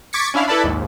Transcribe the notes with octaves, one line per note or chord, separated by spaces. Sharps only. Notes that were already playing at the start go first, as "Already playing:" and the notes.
C#6 D6 G#6 A6 B6 C#7
C#4 D4 E4 F5
E4 A4 B4 D5 A5 B5
A#1 D#2 G#2